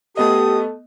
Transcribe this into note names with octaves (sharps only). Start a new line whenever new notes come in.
A3 B3 G4 A4 D#5 D#6